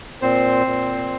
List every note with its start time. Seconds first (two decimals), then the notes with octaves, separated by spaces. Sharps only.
0.22 A#2 C4 C5
0.66 A#2